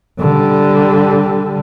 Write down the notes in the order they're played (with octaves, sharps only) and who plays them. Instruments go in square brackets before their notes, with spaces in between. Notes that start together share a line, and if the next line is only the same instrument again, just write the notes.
[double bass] D3 G3